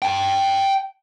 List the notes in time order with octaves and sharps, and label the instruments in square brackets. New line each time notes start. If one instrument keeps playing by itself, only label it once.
[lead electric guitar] G5 A5